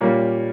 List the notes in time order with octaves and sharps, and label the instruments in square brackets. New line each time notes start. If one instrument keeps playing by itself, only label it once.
[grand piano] A#2 G3 A#3 C#4